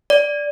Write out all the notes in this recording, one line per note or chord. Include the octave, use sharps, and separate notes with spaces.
D5